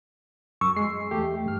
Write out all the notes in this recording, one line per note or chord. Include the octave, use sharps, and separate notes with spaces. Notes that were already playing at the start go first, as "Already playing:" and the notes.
F#2 C#6 E6
G#3 C7
E2 A3 G4
G2 F6